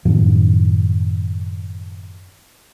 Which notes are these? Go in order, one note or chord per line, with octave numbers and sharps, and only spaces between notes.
F#2 A2 D#3 F3